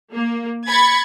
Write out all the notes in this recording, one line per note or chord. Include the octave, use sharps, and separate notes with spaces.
A#3
B5 G#6 A6 C#7